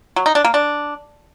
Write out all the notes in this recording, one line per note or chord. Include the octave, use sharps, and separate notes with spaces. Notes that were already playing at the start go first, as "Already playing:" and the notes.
F#3
D#4
D4
A#3
D4